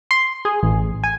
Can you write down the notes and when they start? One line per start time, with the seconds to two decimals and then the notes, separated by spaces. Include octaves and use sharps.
0.11 C6
0.45 G#4
0.63 A1
1.04 G#5